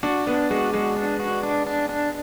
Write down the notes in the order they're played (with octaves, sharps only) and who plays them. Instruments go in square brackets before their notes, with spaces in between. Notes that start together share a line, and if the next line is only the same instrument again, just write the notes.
[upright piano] D4 [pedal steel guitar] F#4
[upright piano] B3 [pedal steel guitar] D4
[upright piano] G#3 [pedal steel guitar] F#4
[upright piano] G#3 [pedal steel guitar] F#4
[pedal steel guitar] D4
F#4
D4
D4
D4